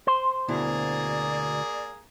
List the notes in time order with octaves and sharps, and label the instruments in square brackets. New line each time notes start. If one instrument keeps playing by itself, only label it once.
[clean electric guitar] C5 [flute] C6
[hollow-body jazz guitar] D2 B2 E4 [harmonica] A#3 G#4 A#5 [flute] D5